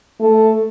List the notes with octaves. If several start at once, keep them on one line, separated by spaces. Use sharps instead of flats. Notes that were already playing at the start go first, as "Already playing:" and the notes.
A3